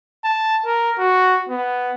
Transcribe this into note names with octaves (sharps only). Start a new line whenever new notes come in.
A5
A#4
F#4
B3